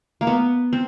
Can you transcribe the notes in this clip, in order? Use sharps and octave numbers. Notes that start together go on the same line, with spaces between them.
A#3
B3
C4